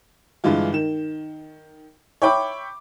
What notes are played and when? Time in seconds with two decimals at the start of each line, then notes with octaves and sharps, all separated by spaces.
0.44 G2 D3 E3 G#3 F4
0.73 D#3 E7
2.22 C#5 E5 G5 B5 D6